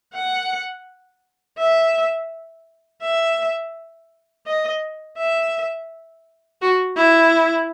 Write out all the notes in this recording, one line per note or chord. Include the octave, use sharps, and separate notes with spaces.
F#5
E5
E5
D#5
E5
F#4
E4